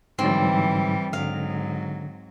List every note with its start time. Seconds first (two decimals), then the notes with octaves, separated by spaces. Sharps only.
0.19 G#2 D3 E3 F#3 G3 C4
1.13 G#2 D3 F#3 F5